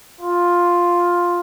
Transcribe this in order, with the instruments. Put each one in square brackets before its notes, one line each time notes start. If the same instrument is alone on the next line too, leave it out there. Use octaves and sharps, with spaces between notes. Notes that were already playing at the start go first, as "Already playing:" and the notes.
[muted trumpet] F4